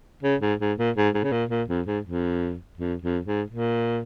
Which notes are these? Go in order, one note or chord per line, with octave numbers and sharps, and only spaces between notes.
C#3
G#2
G#2
A#2
G#2
G#2
C#3
A#2
A#2
F2
G#2
F2
F2
F2
G#2
A#2